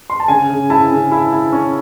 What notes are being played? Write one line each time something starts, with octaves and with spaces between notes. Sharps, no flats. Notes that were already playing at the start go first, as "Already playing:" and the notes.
C6
A5
C#3 G#5
C#3
E4 A5
C#3
E4
E4
C#4